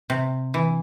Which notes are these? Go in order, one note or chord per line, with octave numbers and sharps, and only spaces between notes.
C3
E3